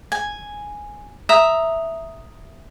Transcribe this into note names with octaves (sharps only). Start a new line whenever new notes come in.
G#5
E5 A#5 D#6